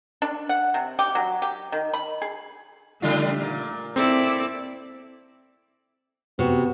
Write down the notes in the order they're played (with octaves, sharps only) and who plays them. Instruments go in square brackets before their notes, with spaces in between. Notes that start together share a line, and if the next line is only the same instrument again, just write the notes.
[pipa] D4
F#5
C3
G4
F#3
G4
D#3
B5
G#4
[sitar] C#3 G3 F4 [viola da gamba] A3
[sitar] A#2
[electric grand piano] C4 [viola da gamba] E4 A4 D5
[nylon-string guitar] C3 F#4 [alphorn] B3